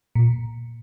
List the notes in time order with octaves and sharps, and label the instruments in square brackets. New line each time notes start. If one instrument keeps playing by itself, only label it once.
[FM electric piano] A#2